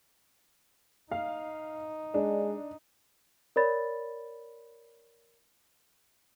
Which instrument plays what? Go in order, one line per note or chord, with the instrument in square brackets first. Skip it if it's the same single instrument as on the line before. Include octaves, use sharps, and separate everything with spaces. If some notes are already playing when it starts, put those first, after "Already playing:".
[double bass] D#4 [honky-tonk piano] F5
[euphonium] G#3 [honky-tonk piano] D4
[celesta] A#4 C#5 D5 B5 A6